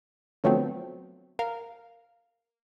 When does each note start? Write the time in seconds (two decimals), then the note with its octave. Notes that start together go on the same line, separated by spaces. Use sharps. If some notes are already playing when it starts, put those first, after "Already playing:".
0.44 D3 F3 F#3 A3 B3 C4
1.39 A#4 F5